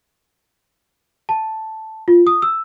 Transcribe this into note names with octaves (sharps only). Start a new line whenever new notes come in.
A5
F4
D#6
E6